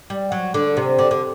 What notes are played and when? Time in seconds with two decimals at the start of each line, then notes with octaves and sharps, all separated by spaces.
0.10 G3
0.32 F#3
0.54 D3
0.77 C3
0.99 D3
1.11 D3